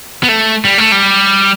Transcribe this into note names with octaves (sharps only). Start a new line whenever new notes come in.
B3
A3
G3
A3
G3